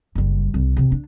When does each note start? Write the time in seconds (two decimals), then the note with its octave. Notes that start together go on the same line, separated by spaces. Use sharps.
0.15 F#1 G3
0.54 C2
0.77 E2 C3
0.92 D4